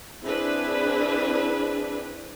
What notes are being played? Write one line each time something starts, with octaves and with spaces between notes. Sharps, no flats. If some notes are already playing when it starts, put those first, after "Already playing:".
C4 D4 E4 G#4 B4